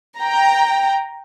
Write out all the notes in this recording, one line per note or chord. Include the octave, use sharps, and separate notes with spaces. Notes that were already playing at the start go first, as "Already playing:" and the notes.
G5 A#5